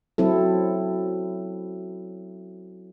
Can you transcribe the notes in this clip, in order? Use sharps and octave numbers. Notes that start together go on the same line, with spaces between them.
F#3 C4 E4 A4